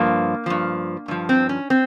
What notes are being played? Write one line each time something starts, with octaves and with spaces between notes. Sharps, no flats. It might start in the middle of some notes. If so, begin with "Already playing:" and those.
Already playing: G2 F3 A#3
G2 F3
G2 F3
C4
C#4
C4